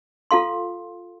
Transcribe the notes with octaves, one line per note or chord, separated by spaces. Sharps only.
F4 A4 F5 C6